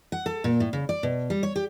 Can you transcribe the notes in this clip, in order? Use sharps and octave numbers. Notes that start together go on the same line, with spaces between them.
F#5
A4
A#2
A2
C#3
D5
B2
G3
C#5
G4